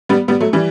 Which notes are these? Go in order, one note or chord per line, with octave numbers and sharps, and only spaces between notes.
G3 B3
G3 B3
F#3 A3
E3 G3